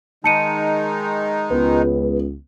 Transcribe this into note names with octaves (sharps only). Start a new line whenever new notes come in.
D#3 G#3 D#4 A5 C#7 D#7
C#2 B3